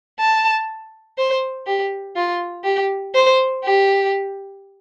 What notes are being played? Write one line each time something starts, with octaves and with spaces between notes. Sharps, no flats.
A5
C5
G4
F4
G4
C5
G4